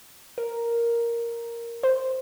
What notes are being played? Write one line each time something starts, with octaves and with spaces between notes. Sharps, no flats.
A#4
C5